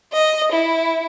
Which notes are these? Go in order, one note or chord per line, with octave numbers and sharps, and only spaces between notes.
D#5
E4